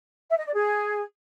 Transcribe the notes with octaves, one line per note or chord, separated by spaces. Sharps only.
E5
D#5
D5
G#4